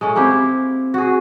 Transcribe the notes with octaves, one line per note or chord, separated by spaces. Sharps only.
G#3 A3 C#4
A#3 C4 E4 G4
F#4 G#4